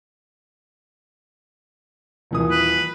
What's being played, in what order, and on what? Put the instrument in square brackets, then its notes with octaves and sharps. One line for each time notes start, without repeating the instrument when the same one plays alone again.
[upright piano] D#1 E3 D#6
[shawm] B4